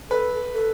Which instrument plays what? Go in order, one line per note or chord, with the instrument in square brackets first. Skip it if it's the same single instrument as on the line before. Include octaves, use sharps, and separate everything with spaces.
[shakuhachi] A4 [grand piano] B4
[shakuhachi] A4